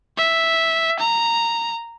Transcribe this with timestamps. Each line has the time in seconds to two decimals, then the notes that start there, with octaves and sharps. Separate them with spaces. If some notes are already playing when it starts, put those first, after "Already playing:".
0.17 E5
0.99 A#5